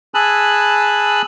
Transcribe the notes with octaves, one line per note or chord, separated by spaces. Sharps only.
G#4 G#5 A5 B5 E6 F#6